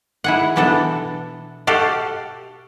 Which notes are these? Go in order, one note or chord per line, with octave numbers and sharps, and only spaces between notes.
E4 G#4 F#5
B2 E3 B3 D4 A4 G5
F#4 G4 A4 F5